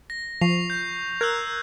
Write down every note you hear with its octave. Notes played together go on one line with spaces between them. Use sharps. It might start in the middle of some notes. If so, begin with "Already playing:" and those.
A#6
F3 C#6 C7 F7
G6
A#4 E6 F#6 G#6